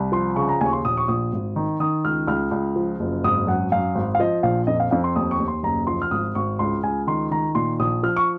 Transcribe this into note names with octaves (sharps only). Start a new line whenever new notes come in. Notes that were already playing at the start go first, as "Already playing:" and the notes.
Already playing: C2
F3 C6
C#3 C#6
A#5
D#2 G#5
C#6
C6
A#1 D#6
C#6
A#1 D#6
G#1
D#3
D#3 D#6
C#2 F6
C#2 F6
C#2
F3
F#1
G#1 D#6
F#2 F#5
F#2 F5
G#1
F5
F3 D#5
A#1 F5
F2 D#5
F5
F2 F5
C6
D#2 D#6
C#6
D#2
C6
F#1 A#5
F3 C6
F6
G#1 D#6
G#1 C#6
C#2 C6
C#2 G#5
D#3 C6
D#3 A#5
A#2 C6
A#1 D#6
F3 F6
C#6